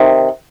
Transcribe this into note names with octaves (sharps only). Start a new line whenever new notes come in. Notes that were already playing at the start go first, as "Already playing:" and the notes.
Already playing: C3 D#3